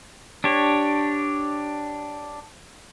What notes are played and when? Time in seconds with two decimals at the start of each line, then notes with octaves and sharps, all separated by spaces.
0.44 D4 G4 C#5